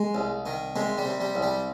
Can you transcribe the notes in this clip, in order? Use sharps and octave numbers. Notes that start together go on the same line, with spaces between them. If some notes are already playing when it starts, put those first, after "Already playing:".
Already playing: G#3
C2
D#3
C3 G#3
G3
C3
G3
C2
G3